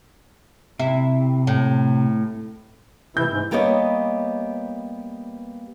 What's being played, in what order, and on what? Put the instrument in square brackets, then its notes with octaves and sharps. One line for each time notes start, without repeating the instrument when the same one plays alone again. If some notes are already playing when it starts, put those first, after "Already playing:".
[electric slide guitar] C3 [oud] E4
[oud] A2
[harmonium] C3 E3 E4 [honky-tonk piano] G6
[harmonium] G#2
[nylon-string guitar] G3 A#3 B3 G4 C#5 D#5